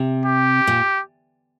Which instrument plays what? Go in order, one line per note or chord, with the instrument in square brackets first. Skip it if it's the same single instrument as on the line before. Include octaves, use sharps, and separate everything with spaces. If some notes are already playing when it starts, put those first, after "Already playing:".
Already playing: [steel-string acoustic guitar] C3
[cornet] G4
[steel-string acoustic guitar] A#2